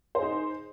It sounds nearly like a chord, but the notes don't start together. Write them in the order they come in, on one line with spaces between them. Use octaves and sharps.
C5 G#4 D#4